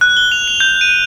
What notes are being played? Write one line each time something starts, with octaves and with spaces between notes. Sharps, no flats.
F#6
G7
F7
F7
G6
D#7